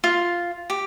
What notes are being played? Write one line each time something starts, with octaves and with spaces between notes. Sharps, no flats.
F4
G4